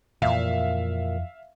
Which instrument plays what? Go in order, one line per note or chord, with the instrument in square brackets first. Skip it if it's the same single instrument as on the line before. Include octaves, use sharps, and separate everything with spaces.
[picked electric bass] F2 E3 [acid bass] A#2 [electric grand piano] E5 F5